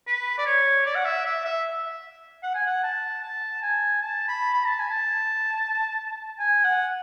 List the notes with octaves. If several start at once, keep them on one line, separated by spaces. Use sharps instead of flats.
B4
D5
C#5
D5
F#5
E5
E5
E5
F#5
G#5
F#5
A5
A5
G#5
A5
B5
B5
A5
G#5
A5
G#5
F#5